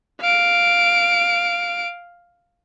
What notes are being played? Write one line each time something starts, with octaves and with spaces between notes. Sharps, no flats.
F5 D7